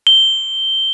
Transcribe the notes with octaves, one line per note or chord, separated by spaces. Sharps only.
G7